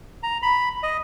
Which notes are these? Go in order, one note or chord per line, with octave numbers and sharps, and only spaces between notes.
A#5
B5
D#5